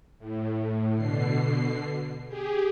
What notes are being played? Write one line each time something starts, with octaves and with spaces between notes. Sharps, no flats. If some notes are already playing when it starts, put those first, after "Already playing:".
A2
B2 D3 C7
G4 G#4